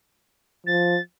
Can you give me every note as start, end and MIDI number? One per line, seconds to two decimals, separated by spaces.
0.67 0.97 53
0.67 1.01 93